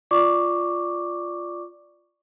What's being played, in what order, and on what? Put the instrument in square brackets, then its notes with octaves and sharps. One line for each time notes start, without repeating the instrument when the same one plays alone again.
[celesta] F4 D5 C#6 D6